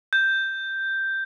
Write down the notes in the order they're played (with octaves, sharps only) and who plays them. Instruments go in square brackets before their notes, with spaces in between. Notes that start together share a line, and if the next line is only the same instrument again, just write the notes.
[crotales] G6